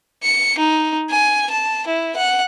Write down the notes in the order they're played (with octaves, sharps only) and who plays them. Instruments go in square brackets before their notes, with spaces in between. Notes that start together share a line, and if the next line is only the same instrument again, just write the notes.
[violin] C#7
D#4
G#5
A5
E4
F#5